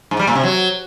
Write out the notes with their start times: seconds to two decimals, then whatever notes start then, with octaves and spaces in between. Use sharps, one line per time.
0.11 G#2
0.19 G3
0.27 A#2
0.35 C3
0.43 F#3